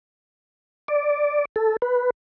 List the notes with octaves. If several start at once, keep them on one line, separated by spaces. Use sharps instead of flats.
D5
A4
B4